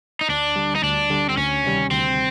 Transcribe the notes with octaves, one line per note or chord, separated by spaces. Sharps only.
D#4
D2 D4
D3 G3
D#4
D2 D4
D3 G3
C4
D2 C#4
C3 D#3 G3
D2 C4